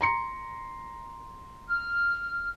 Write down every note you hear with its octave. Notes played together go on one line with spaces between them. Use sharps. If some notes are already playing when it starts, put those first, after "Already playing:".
A#5 C6 C#7
F6